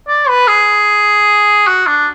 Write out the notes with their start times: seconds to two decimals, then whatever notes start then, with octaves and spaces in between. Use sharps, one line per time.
0.08 D5
0.29 B4
0.48 G#4
1.67 F#4
1.87 D4